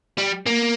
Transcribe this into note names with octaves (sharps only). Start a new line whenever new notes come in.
G3
A#3